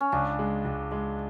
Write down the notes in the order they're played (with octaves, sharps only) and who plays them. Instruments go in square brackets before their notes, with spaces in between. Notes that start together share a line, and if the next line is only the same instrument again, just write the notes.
[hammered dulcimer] C#4
[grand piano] C#2 [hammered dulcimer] D4
[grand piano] G#3
C#2
G#3